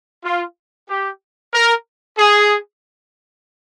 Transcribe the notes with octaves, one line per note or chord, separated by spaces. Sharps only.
F4
G4
A#4
G#4